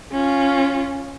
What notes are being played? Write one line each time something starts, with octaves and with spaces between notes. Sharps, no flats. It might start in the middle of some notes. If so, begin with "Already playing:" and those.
C#4 F4